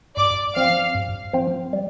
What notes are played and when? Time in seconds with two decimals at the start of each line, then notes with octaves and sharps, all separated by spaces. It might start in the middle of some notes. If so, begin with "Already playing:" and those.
0.17 G2 D5 D6
0.55 F3 C4 F5 F6
0.95 G2
1.33 F3 C4
1.73 G3